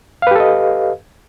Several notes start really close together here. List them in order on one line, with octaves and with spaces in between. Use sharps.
F5 B4 G4 A4 D#5